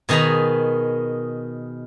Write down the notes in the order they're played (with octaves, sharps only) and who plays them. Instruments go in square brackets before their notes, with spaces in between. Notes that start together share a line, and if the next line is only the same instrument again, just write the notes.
[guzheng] B2 D#3 G#4 A#5 B5